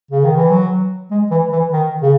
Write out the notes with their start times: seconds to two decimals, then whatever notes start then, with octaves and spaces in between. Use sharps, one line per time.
0.11 C#3
0.25 D#3
0.36 E3
0.50 F#3
1.11 G#3
1.31 E3
1.52 E3
1.73 D#3
2.02 C#3